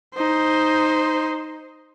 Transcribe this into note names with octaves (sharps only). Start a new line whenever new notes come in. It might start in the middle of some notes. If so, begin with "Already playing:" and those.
D#4 C5